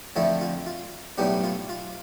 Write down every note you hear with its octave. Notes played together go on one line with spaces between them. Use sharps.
F2 D3 F3 A3 C4 E4
F4
F4
B1 A2 G3 B3 D4 G4
F4
F4